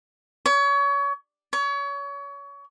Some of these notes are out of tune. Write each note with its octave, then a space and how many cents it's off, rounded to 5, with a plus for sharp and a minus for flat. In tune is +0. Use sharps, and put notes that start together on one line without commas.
C#5 +30
C#5 +30